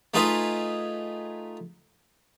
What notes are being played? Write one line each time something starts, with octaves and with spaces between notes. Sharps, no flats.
A3 D#4 F4 G#4 B4